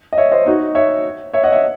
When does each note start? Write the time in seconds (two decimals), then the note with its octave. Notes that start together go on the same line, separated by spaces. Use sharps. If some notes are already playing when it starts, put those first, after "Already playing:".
0.13 D#5
0.18 C#5 E5
0.32 C5 D#5
0.46 D#4 F#4
0.75 C#5 E5
1.33 C#5 E5
1.43 D#5 F#5
1.52 C#5 E5